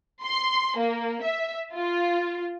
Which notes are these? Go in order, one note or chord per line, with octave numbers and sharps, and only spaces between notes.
C6
A#3
E5
F4